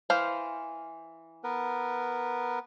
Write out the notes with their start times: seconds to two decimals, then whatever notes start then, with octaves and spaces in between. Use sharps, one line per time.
0.10 E3 C5 F5
1.44 B3 A#4 B4